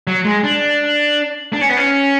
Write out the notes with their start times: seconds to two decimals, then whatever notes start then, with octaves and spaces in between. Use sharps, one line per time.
0.07 F#3
0.25 G#3
0.44 D4
1.53 D4
1.61 C#4
1.69 B3
1.77 C#4